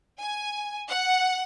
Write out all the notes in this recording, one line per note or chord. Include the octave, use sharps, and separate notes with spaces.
G#5
F#5